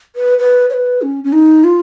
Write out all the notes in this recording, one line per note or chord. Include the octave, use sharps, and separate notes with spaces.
B4
B4
C#5
B4
C#4
C#4
D#4
F4